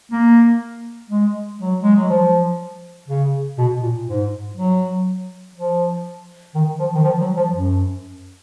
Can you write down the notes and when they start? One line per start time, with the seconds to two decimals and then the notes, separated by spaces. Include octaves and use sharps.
0.12 A#3
1.10 G#3
1.59 F#3
1.82 G#3
1.95 F#3
2.09 F3
3.08 C#3
3.58 B2
3.82 A#2
4.07 G#2
4.57 F#3
5.55 F3
6.55 D#3
6.79 F3
6.94 D#3
7.04 F3
7.21 F#3
7.37 F3
7.53 F#2